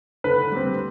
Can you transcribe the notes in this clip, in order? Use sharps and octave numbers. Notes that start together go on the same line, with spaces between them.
D3 B4
G3 C4